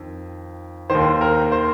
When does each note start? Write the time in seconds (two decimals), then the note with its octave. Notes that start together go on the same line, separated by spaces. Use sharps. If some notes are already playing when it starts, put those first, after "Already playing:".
Already playing: F2 D#3
0.90 D#2 D#3 C5
1.21 A#4
1.52 C5